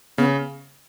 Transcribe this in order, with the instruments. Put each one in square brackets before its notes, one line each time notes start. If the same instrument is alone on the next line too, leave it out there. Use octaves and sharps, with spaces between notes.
[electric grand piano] C#3 [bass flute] B3